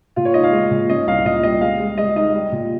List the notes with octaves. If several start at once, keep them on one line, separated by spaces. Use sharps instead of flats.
A#2 F4
C#5
D#4 D#5
F5
G#3
A#2
C#4 D#5
C2 F5
A#2 D#5
G3 D#5
G#3 F5
G#3
G#3 D#5
D#4 D#5
G3
A#2